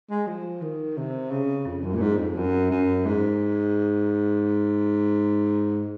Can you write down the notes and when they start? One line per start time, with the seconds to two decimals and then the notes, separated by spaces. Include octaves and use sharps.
0.10 G#3
0.27 F3
0.62 D#3
0.98 C3
1.31 C#3
1.66 F2
1.84 F#2
1.95 A#2
2.01 G#2
2.18 F2
2.37 F#2
2.71 F#2
3.06 G#2